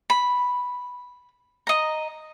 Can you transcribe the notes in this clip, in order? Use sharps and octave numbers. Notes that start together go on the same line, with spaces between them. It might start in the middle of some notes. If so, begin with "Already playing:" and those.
B5
D#5 A#5